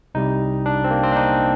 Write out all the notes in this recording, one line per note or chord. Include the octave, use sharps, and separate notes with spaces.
C2 C3 G3 D#4
D4
C4
A#3
C4
D4
D#4